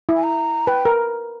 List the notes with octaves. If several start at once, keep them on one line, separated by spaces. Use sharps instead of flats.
E4
G#5
A#5
B4 G5
A#4